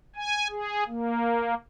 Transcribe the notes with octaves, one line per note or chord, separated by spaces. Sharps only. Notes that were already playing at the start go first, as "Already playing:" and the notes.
G#5
G#4
A#3